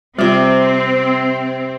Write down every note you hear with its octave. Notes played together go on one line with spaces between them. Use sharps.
C3 G3 C4 F4 D5